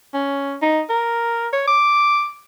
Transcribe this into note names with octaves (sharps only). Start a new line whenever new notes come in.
C#4
D#4
A#4
C#5
D6